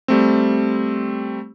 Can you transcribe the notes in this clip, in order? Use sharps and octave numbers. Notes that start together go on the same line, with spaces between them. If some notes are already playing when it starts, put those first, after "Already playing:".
G3 A3 C4